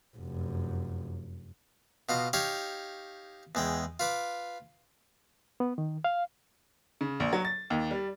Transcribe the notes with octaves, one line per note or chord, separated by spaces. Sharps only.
F1 F#2
B2 F4 D#5
D#4 G4 C#5 F5
E2 G#3 G5
F4 B4 D6
B3
D#3
F5
C#3
A#1
F#3
A6
D#2
G3